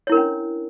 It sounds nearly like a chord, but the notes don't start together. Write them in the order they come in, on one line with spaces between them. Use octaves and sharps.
C#5 E4 A#4 D4 C#4